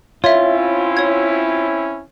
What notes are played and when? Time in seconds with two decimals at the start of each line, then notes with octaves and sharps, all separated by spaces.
0.24 C4 C#4 E4 F4 C#5 E5
0.97 C#5 G#6